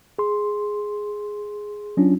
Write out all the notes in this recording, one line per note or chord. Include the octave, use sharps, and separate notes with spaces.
G#4 C6
F#3 C#4 D4 F4